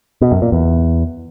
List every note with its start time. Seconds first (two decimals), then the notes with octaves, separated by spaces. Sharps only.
0.21 B2
0.32 F#2
0.42 A#2
0.52 E2